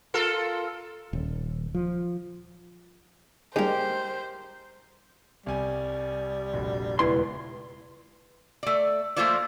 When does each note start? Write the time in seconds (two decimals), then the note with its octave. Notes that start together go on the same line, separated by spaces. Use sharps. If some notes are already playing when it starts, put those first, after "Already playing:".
0.14 F4 A4 A#4
1.13 D#1
1.75 F3
3.56 G3 G#3 A#3 D4 G4 A#4 C5
5.46 C2 G3 G#5
6.53 F1 A#1 F#4
6.99 E1 C#2 B3 E4 B4 C6
8.63 A3 D5
9.16 F3 A3 A#3 F4 C5 D5